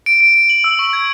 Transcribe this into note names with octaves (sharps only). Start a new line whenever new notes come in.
D7
D7
D7
F#7
E6
C#6
G#6